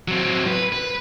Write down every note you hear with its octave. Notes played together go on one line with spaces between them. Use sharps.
F#3 C4
B4
B4